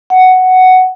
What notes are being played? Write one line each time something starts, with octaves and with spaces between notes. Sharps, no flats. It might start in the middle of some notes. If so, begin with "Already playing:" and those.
F#5